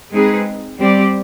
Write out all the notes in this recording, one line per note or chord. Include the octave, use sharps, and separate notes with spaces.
G#3 C4 D#4 G#4 B4
G3 C4 G4 D5